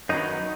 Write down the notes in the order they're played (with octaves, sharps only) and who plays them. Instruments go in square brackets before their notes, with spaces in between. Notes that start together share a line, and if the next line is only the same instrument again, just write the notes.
[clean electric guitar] F#2 D#3 F#3 B3 D#4